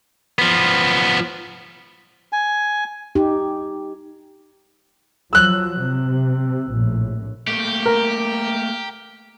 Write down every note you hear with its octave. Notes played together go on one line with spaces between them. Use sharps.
F3 B3
G#5
D#4 G4
F3 F#3 E6 F#6
C3
A#1 A2
A3 A#3 G4
A#4